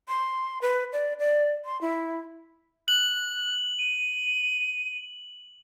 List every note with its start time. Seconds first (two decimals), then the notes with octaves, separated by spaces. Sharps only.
0.08 C6
0.62 B4
0.93 D5
1.19 D5
1.65 C6
1.81 E4
2.88 F#6 F#7
3.79 D#7